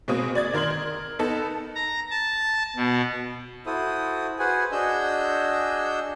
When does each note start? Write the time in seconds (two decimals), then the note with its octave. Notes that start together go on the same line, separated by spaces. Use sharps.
0.08 B2 G#3 A#3 C4 D#6
0.35 D5 G#6 A6
0.54 D#3 A#4 C6 G#6 F#7
0.70 A#4
1.19 B3 D#4 A4 A5
1.75 A#5
2.10 A5
2.76 B2
3.66 E4 F#4 A4 C5 D#6
4.39 F#4 G#4 B4 C5 F#5 G#5
4.72 D4 F#4 G#4 D#5 E6 G6